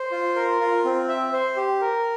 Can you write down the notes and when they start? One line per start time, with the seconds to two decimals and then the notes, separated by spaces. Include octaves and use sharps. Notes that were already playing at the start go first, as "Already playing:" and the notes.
Already playing: C5
0.12 F4
0.36 A#4
0.61 F4
0.85 C4
1.09 E5
1.33 C5
1.56 G4
1.81 A#4